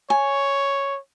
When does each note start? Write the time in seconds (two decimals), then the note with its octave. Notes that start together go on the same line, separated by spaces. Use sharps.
0.10 C#5 G#5